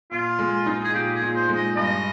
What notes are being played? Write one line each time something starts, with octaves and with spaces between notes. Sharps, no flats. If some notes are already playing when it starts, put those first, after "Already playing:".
A#2 F4
G#3
D#4
G#4
A#2 G4
G#4
A#2
C5
G#3
D#5
G2 D#5